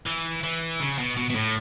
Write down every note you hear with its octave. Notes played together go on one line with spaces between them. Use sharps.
E3
E3
C#3
B2
B2
B2
A2